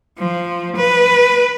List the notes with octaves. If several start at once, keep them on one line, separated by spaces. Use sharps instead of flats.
F3
B4